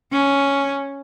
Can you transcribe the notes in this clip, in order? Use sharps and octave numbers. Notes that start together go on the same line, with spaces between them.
C#4